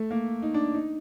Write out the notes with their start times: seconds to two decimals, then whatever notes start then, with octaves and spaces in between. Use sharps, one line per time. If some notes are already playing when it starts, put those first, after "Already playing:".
Already playing: A3
0.11 A#3
0.42 D#4
0.54 D4
0.74 D#4